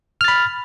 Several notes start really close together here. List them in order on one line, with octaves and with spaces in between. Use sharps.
F6 A6 B5